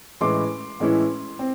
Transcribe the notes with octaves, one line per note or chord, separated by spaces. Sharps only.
A2 E3 G#3 C#4 E4 C6 D6
A2 E3 G#3 C#4 E4
C4